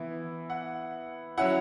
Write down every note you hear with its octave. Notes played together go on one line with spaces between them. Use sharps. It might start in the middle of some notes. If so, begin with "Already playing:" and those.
Already playing: E3 B3 E4
F#5
F#3 C#4 E4 F#5